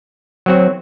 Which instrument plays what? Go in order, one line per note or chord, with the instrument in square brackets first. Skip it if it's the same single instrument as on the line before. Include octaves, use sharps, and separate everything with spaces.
[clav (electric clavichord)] F#3 C4 F#4